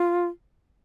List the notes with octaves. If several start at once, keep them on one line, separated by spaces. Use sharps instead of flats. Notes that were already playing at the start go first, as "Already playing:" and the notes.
Already playing: F4